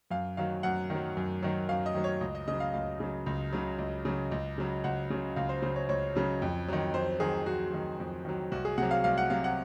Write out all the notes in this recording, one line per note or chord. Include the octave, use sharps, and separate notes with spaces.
F#2 F5
D#3 F#3 F5
F#2 F#5
D#3 F#3
F#2
D#3 F#3
F#2 F5
D#5
D#3 F#3
C#5
C#2 D#5
D#5
C#3 F#3 D#5
F5
C#2 F5
C#3 F#3
C#2
C#3 F#3
C#2
C#3 F#3
C#2
C#3 F#3
C#2 F#5
C#3 F#3
C#2 F5
C5
C#3 F#3 C5
C#5
C#2 C#5
C#3 F#3
F2
D#3 F#3
F2 C5
D#3 F#3 G#4
F2 F#4
D#3 F#3
F2
D#3 F#3
C2 F#4
G#4
C3 F#3 F#5
F5
C2 F5
F#5
C3 F#3 F5
F#5